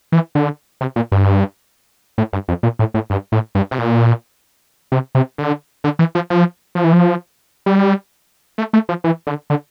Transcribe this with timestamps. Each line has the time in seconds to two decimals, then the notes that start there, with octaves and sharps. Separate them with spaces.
0.12 E3
0.35 D3
0.81 C3
0.96 A#2
1.12 G2
2.18 A2
2.33 G2
2.48 F2
2.63 A#2
2.79 A2
2.94 A2
3.10 G2
3.32 A2
3.55 G2
3.71 C3
3.78 A#2
4.92 C3
5.15 C3
5.38 D3
5.84 D3
5.99 E3
6.15 F3
6.30 F3
6.75 F3
6.84 E3
6.93 F3
7.66 G3
8.58 A3
8.73 A3
8.89 F3
9.04 E3
9.27 D3
9.50 D3